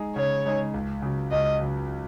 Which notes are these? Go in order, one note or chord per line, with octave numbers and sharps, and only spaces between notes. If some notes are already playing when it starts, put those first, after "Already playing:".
Already playing: G#3 D#4 G#4
C#3 C#5
G#3 D#4 G#4
C#2
C#3 F#3
C#2 D#5
C#3 F#3